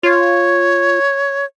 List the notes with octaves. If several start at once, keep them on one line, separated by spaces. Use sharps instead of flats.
F4 C#5